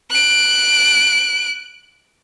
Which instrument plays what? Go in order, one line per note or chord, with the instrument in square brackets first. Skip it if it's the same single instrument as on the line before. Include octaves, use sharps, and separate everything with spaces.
[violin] F#6 D7